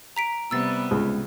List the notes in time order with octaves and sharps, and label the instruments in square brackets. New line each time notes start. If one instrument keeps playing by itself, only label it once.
[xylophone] A#5 B6 D7
[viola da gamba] C3 G3 B3 [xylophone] E6 A6
[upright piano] C#2